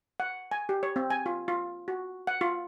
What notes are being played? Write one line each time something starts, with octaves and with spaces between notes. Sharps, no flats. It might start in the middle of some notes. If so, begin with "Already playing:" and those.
F#5
G#5
G4
C#5
C4
G#5
F4
F4
F#4
F#5
F4